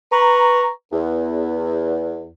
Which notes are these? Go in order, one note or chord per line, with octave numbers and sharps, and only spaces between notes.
B4 A#5 C#6
E2